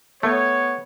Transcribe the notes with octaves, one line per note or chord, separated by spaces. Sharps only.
A3 B3 C#5